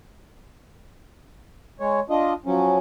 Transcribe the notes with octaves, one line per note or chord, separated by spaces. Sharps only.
G#3 C#5
D4 F4 D#5
F3 F#3 C#4